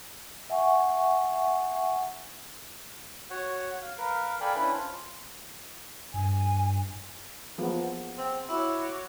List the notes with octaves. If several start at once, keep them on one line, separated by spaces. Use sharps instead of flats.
E5 F#5 G#5 C#6
F#4 C#5 F#5
F5
A#4 B4 F5
A4 D5 F5 G5 G#5 B5
C#4 D4 E4 B4
F4 C5
G2 G#5
F3 A#3 B3 G#4 F#5
C4
E4 F#4 C#5 D6